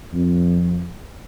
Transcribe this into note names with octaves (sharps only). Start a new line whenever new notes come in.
F2